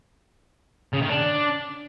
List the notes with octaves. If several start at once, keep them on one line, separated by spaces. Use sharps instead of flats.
C#3
D#3
D4